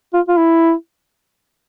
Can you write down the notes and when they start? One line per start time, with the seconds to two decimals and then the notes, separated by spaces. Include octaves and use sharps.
0.13 F4
0.28 F4
0.37 E4